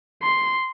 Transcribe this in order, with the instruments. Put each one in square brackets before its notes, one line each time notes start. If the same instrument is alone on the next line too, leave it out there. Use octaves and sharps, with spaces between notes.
[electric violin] C6